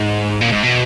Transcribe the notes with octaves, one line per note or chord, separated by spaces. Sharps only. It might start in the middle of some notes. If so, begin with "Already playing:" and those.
Already playing: G#2
A#2
G#2
B2